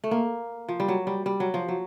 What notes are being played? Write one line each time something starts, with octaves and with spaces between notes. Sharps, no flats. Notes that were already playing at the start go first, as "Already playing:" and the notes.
A3
A#3
F3
G3
F#3
G3
G3
F#3
F3
F#3